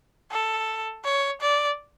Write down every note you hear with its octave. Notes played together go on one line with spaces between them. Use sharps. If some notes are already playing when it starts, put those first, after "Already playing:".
A4
C#5
D5